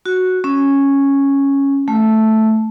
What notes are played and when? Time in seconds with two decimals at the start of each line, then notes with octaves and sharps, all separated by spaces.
0.06 F#4
0.44 C#4
1.88 A3